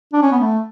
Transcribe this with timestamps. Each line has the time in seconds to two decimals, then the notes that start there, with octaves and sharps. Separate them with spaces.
0.13 D4
0.22 C#4
0.32 B3
0.40 A3